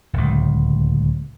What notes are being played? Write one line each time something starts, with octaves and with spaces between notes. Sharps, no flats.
D1 C#2